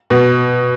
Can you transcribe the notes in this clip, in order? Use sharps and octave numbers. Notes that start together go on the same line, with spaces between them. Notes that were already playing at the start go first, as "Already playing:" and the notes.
B2